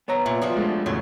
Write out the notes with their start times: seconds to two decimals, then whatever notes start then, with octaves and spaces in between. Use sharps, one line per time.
0.08 B3 C#5 A#5
0.26 A#2 E5
0.42 F3 G3 F#4
0.56 G#3 A3 D4
0.86 E2 A2 C#3 F#3